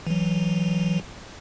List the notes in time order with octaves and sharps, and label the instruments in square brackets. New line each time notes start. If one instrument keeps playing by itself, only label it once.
[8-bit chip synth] E3 F#3